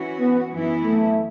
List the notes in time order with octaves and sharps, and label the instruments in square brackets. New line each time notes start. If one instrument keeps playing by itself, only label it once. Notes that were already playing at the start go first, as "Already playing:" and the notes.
Already playing: [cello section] E3 C#4 F#4
[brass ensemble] B3
[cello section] F#2 E3 B3 E4
[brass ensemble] A3